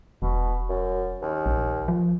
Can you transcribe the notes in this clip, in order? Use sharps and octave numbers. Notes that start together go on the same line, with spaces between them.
E1 B2
F#2
D#2
A#1
F3